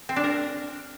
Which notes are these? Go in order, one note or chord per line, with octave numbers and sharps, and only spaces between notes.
C4
D4
A#4